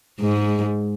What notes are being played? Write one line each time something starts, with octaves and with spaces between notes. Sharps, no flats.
G#2 G#3